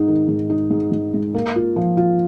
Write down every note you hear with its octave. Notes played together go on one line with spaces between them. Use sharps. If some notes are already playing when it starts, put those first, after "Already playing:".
Already playing: G#2 D#4
D#3
G#2
D#4
G#2
G#2
G#3
A#3
F4
F3
F4